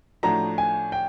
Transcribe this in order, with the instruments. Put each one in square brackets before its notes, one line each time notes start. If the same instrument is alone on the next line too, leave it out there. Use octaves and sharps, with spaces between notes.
[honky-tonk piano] A2 F3 A3 D4 F#4 [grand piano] A#5
[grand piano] G#5
G5